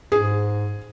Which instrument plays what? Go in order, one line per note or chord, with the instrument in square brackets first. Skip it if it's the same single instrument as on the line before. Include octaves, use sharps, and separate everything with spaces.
[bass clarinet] G#2 [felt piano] G#4